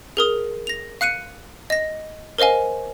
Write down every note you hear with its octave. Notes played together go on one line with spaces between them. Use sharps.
G#4 A#4 D#6
A#6 F7
F5 F#6 C#7 D#7
D#5 A#6
A#4 C5 D#5 F5 G#5